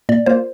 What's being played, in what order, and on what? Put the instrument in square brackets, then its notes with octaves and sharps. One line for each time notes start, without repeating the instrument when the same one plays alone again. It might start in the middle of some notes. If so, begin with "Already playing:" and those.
[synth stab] A#2 [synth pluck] D5
[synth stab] A#3 F4 [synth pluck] C5